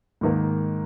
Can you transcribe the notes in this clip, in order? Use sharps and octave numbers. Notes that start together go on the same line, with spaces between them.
G#2 D#3 A#3